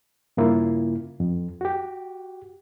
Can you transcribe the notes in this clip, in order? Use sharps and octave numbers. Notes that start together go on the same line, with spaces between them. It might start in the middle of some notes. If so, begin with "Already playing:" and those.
G2 C#3 A#3 E4 F4
F2
F#4 G4